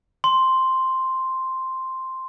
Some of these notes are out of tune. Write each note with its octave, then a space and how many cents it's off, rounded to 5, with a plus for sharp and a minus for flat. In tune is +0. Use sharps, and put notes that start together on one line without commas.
C6 +0